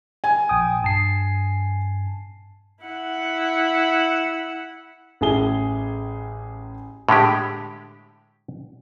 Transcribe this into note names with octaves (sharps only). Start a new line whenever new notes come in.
G#5
A#1 G5 D#6
G2 A5 C7
E4 F#5
A1 A2 G#4 G7
A2 D3 G#3 G4